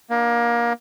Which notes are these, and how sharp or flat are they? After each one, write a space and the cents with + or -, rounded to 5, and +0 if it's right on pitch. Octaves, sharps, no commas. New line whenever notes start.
A#3 +25 D4 +40